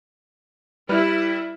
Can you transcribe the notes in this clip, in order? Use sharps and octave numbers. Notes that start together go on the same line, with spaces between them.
G3 E4 B4 F6